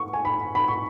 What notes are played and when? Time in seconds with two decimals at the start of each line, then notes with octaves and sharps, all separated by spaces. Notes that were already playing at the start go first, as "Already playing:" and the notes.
Already playing: C#6
0.13 G#5
0.25 B5
0.55 B5
0.68 C#6